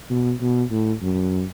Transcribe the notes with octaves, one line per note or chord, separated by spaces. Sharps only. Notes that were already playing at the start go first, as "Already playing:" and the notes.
B2
B2
A2
F#2